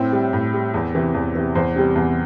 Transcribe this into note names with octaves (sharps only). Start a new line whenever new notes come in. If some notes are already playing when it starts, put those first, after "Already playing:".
Already playing: A2 C4
G3
A2
G3
E2
C3 E3
E2
C3 E3
E2 C5
C3 G3
E2